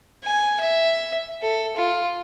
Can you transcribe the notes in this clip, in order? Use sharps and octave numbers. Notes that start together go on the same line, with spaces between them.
G#5
E5
A4
F4